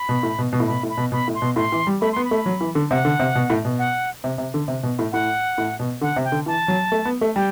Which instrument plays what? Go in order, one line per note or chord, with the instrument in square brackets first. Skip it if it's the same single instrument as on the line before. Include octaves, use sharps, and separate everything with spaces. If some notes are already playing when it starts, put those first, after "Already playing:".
Already playing: [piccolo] B5
[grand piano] B2
A2
B2
B2
A2
[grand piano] B2 [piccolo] B5
[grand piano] A2
[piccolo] B5
[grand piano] B2
[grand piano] B2 [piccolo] B5
[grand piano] A2
[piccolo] C6
[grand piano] B2
[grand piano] A2 [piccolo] C6
[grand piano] E3
G3
[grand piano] A3 [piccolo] B5
[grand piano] B3 [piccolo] C6
[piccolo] B5
[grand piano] A3
F#3
E3
D3
[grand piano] C3 [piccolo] F#5
[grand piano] D3
C3
B2
A2
B2
[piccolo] F#5
[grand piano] C3
C3
D3
C3
B2
A2
[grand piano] A2 [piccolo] F#5
[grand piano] A2
B2
[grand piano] D3 [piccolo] F#5
[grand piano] C3
[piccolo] G5
[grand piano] D3
[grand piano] E3 [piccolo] A5
[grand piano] F#3
A3
B3
A3
[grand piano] G3 [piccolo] G5